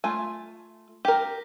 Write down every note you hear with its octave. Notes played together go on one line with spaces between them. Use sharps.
A3 F4 G#5
G4 A#4